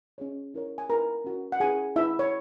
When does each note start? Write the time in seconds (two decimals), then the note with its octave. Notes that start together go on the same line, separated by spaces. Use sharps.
0.18 C#4 G#4 C#5
0.54 E4 A#4 C#5
0.78 G#5
0.89 E4 A#4 B4 A#5
1.25 C#4 F#4 A#4
1.52 F#5
1.60 C#4 E4 G#4 B4 G#5
1.96 E4 G#4 B4 E5
2.19 C#5